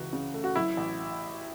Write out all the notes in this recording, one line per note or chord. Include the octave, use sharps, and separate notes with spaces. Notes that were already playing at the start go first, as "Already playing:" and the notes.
Already playing: C#2 E3 F#4
C#3
A3
F#4
F#3 E4
A1